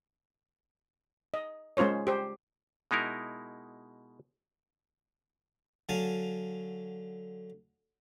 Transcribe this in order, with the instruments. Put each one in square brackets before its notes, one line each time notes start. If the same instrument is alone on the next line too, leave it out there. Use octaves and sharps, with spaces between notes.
[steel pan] D#5
G#3 C#4 F4 C5 C#5
G4 C5
[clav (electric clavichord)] B2 G#3 D#4 E4 A#4
[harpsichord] D3 F#3 F5 G#5 A5